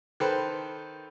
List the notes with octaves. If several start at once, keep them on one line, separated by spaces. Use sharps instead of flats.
D#3 A4 B4 C5